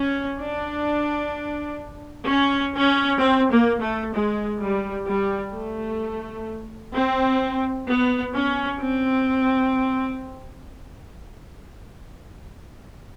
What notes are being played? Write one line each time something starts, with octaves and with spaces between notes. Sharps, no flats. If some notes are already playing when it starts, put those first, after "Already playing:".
Already playing: C#4
D4
C#4
C#4
C4
A#3
A3
G#3
G3
G3
A3
C4
B3
C#4
C4